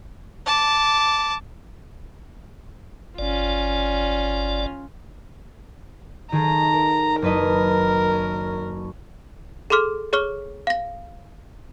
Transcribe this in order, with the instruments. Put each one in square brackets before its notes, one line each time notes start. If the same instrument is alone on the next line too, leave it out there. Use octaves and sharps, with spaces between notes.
[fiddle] A5 D6
[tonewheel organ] G1 D5 [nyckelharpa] C#4 F4
[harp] D#3 G#4 A4 [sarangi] A#5
[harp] A#4
[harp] F#1 B4 D#5 [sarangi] A#4
[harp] C#4
[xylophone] G#4 A4 C6 D6 F6
G#4 C#5 C#6 F6 G7
F5 A#6